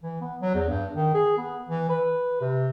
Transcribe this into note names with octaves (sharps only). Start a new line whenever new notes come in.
E3
B3
F#3
E2
G2
D#3
G#4
B3
E3
B4
C3